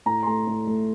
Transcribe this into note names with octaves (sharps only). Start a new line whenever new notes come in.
A2 A#5
C6
A3 A#5
A2
A3